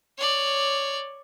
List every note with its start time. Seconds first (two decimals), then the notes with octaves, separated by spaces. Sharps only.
0.18 C#5 D5